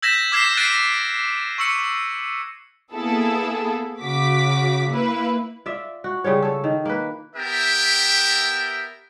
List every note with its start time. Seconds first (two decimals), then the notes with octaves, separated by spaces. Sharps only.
0.02 E6 G6 G#6 A#6 B6 E7
0.32 D6 F6 G#6 B6 C7 E7
0.57 F#6 A6 A#6 C7 D7 D#7
1.58 C#6 E6 C#7
2.94 A#3 B3 E4 G#4 A4
4.02 C#3 F#4 D6 B6
4.88 A#3 E4 B4
5.66 F4 D5 E5
6.04 F#4
6.24 C#3 G3 F4 C#5
6.42 A4 C#5
6.64 D#3
6.85 A#3 B4
7.35 B3 G4 A#4 E5 G5